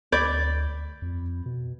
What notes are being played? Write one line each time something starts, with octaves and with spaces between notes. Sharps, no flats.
D2 D5 B5 G6 G#6
F2
B2